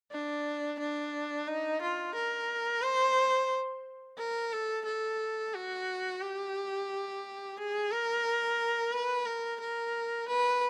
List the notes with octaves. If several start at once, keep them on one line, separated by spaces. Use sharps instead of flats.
D4
D4
D#4
F4
A#4
C5
A#4
A4
A4
F#4
G4
G#4
A#4
B4
A#4
A#4
B4